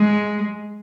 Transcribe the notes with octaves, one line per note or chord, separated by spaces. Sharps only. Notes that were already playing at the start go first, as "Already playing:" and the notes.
Already playing: G#3